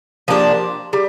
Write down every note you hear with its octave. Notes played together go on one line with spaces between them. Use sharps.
F3 A#3 D4 G4
G3